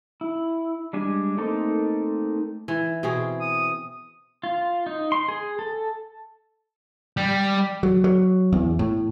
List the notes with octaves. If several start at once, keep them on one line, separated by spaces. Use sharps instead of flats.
E4
G3 G#3 D4 G#5
A3 A#3 C4 D#4 A4
E3
B2 C4 G#4
D#6
F4
D#4
C6
G#4
A4
G3
F#3
F#3
E2
A2